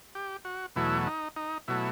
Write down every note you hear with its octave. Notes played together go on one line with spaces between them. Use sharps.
G4
F#4
E2 B2 F#3 A3 E4
D#4
D#4
B2 F#3 A3 E4